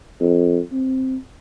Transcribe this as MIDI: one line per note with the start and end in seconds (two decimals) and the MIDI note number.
0.20 0.59 41
0.72 1.16 60